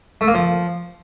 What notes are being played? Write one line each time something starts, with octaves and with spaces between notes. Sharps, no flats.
A3
A#3
F3